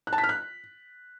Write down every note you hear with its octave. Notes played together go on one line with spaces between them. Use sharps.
F#6
A5
B6
F6
F#6